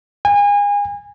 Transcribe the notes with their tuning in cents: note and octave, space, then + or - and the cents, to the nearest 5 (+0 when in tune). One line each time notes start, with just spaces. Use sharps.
G#5 -30